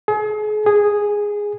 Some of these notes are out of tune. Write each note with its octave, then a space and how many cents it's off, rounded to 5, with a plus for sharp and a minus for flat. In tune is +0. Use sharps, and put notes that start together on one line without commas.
G#4 +40
G#4 -5